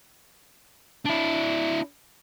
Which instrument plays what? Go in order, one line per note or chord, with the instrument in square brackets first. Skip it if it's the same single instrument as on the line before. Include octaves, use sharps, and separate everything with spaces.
[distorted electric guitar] D4 E4